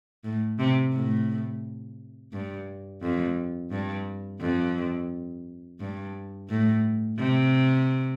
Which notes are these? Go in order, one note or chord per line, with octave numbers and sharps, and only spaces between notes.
A2
C3
A2
G2
F2
G2
F2
G2
A2
C3